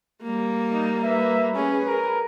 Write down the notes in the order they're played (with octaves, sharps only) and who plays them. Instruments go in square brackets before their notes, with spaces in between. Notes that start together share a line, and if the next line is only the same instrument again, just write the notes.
[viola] G3 A#3
[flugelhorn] D#4
[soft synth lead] B4 [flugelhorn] E5
[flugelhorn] C#4 [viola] G#4
[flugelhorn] A#4